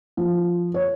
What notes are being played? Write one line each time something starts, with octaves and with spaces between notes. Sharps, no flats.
F3
C#5